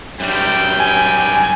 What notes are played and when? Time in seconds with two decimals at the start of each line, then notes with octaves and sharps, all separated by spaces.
0.20 F#2 G3 G5
0.80 G#5